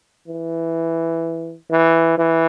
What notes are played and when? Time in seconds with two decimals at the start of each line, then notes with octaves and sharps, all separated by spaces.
0.28 E3
1.70 E3
2.18 E3